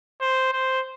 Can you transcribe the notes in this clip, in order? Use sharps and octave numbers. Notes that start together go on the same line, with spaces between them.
C5
C5